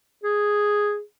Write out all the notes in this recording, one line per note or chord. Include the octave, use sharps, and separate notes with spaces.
G#4